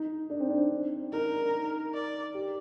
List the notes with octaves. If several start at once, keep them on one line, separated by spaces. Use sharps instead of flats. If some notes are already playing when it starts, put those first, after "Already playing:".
Already playing: D#4
D4
C4
D4
D#4 A#4
D5
G4